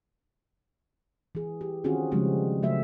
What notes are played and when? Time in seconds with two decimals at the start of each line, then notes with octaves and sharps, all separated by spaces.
1.35 E3 G#4
1.61 G4
1.84 D#3 C4 C#4 F4 F#4 G#4
2.11 C#3 F3 G3 G#3 C4 C#4
2.63 C#3 F#3 A3 C5 E5